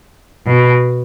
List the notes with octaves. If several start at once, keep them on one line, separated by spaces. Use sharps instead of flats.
B2